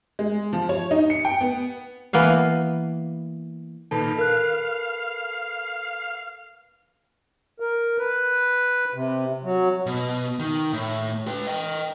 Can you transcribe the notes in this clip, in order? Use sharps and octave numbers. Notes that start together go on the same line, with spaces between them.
G#3
F3
C#5
D#4
C#7
G5
B3
E3 A#3 B3 F5
A#2 D#3 A4 B4 A5 B5
A#4 F5 F#6
A#4
B4
C3
F#3
B2
D#3
A2
B4 G5
D#5 G5